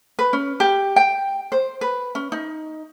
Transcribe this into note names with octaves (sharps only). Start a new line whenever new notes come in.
B4
C#4
G4
G5
C5
B4
C#4
D#4